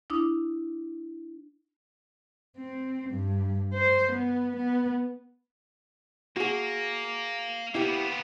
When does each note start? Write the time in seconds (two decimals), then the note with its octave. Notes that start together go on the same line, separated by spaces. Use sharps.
0.10 D4 E4 D6 D#6
2.57 C4
3.10 G2
3.74 C5
4.12 B3
4.56 B3
6.37 A#3 F#4 G#4
7.75 A#3 B3 E4 G4